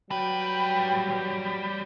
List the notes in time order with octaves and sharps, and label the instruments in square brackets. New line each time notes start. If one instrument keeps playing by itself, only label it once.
[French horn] F#3 [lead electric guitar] G3 B4 [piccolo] G5